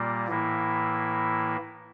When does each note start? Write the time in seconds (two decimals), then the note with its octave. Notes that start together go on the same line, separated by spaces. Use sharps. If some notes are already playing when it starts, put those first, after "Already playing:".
Already playing: A#2 G3 A#3
0.28 A2 E3 A#3 E4